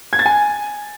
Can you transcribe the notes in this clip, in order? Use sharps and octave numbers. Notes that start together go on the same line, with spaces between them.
G#6
A6
G#5